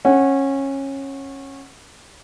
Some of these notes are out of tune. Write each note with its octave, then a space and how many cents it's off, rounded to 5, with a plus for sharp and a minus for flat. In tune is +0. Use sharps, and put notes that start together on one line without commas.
C#4 -20 F#5 +0